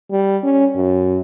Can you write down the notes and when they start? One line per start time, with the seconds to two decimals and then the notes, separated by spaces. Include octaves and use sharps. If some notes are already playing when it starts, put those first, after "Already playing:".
0.11 G3
0.44 C#4
0.76 F#2